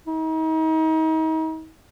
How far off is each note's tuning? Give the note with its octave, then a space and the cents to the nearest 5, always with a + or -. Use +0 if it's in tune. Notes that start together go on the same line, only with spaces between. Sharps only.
D#4 +35